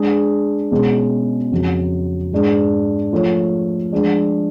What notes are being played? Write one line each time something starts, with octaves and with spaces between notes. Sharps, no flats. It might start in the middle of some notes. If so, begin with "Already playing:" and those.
Already playing: G#3 D4 G#4
B2 G#3 C#4
F2 C#3 F#3
G#2 G#3 D4 G#4
F3 A3 F4 A4 C#5
F3 G#3 D4